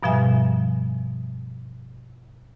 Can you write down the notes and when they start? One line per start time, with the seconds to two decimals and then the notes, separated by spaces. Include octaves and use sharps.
0.03 G2 B2 F3 G3 E5 G#5